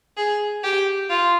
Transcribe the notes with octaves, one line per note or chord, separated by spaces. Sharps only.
G#4
G4
F4